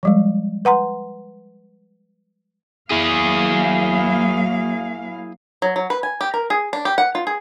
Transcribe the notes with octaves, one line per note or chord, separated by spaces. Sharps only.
F3 G3 G#3
B4 F#5 A#5 C6
F#3 A#3 E4 G#4 F5
F#3
F#3
B4
G#5
G4
A#4
G#4
D4
G4
F#5
F4
G#4